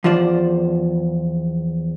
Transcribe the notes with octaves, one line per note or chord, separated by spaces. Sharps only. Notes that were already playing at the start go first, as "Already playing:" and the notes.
E2 F3 F4 C5 D5